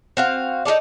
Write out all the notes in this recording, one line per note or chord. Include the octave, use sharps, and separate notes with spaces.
C4 F#4 F5
D#4 F4 A4 D5